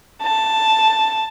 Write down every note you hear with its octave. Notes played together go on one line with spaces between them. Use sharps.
A5